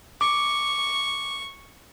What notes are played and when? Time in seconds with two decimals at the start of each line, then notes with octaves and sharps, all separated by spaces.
0.21 C#6 D6